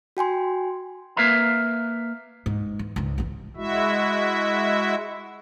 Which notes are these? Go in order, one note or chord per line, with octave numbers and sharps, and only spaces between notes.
F#4 G5 G#5 C6
A#3 A#4 B4 E5 F5 A#5
G#2
E3
C#2 G#2
A#1 E3
G#3 E4 F#4 E5